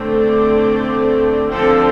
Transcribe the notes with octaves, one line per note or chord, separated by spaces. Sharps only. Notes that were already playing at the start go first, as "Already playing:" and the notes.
Already playing: D3 A3 C4
D5
D3 F3 C4 A4